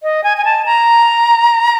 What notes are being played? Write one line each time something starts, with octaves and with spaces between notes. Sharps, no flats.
D#5
G#5
G#5
A5
A#5